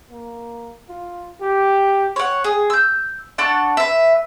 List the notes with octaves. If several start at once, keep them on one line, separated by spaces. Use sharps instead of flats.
A#3
F4
G4
C#5 F#5
G#4
E6 G6
D4 A4 F#5 C#6
B4 E5